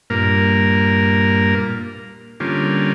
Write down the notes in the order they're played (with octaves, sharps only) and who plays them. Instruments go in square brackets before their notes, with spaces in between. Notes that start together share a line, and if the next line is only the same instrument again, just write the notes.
[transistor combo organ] G2 A#2 A#3 A#4
D3 G3 A#3 C#4 F4